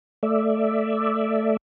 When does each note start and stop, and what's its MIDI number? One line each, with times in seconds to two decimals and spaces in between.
0.23 1.57 57
0.23 1.57 74
0.23 1.57 76